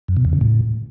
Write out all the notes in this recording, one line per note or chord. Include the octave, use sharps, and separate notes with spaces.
F#2
B2
E2
C#3
A2